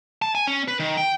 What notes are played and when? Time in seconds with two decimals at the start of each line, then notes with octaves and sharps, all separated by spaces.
0.22 A5
0.35 G#5
0.47 C#4
0.68 B4
0.79 D#3
0.97 G5